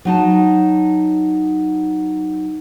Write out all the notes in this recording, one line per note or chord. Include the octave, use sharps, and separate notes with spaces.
F#3 D#4 A5